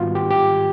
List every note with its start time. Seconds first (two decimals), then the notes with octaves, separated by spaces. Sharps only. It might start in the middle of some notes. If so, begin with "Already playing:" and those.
Already playing: G#2 D#3 G3 B3 F4 F#4
0.15 G4
0.31 G4